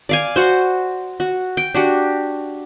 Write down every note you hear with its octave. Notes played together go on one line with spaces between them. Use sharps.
D5 F5 G#5
F#4 C5
F#4
G5
D4 F#4 G4